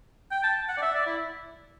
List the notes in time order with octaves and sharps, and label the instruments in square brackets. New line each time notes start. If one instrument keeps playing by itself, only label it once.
[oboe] G5
A5
F#5
D5
E5
D5
E4